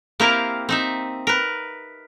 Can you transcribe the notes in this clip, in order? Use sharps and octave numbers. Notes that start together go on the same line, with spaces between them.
A#3 C4 E4 G4 A#4 F5
C4 D#4 E5
A#4 B4